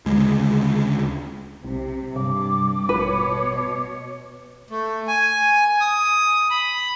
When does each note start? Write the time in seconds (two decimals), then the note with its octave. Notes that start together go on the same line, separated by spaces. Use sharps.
0.06 D2 C#3 G#3
1.65 B1 C3
2.16 G2 C3 D6
2.89 A1 B2 B4 C#5
4.70 A3
5.07 G#5
5.81 D#6
6.50 B5